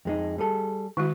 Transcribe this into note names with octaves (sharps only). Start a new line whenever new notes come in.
F2 G#3 D#4
G3 G#4 A4
D#3 G#3 E4 F#4